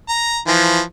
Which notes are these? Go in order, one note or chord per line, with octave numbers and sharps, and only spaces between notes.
A#5
E3 F3